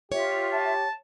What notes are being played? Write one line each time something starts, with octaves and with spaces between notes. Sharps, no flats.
F4 G4 C#5 E5
A5